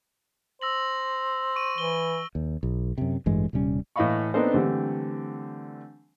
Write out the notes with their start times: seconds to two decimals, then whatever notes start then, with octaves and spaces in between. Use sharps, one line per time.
0.61 C5 E6 A#6 F#7
1.56 C#6 D#7
1.78 E3 G7
2.35 D#2
2.63 B1
2.98 F#2 C3
3.26 A1 G2 E3 G#3
3.53 D#1 C3 G3 C#4
3.96 A2 E3 D#5 F5 B5 C#6
4.34 B3 C4 D4 D#4 A4 C5
4.54 D3 E3 G3 A3 C4